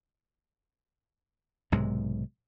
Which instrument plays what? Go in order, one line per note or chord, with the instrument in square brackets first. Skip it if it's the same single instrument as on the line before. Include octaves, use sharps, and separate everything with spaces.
[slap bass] B1 G#2 C3 G#3